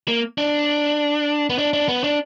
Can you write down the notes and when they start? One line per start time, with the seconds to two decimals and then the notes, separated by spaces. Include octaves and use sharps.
0.08 A#3
0.38 D4
1.50 B3
1.58 D4
1.73 D4
1.88 B3
2.04 D4